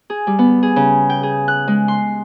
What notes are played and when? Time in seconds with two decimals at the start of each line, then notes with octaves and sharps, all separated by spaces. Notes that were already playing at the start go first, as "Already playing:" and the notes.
0.10 G#4
0.27 G3
0.39 B3
0.63 G#4
0.76 C#3
1.10 G5
1.23 G#4
1.48 F#6
1.68 G#3
1.88 C6